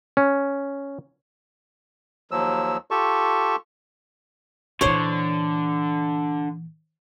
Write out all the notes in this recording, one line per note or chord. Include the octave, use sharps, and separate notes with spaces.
C#4
D#2 F3 F#3 E6
F4 G4 A4 A5 C#6
A#2 D3 E3 C5 C#5